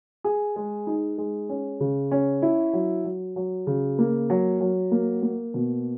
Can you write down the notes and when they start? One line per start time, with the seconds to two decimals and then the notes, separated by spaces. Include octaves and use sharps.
0.24 G#4
0.56 G#3
0.87 D#4
1.18 G#3
1.49 C#4
1.80 C#3
2.11 C#4
2.42 E4
2.73 F#3
3.04 F#3
3.36 F#3
3.67 C#3
3.99 A#3
4.30 F#3
4.61 F#3
4.92 A#3
5.23 A#3
5.54 B2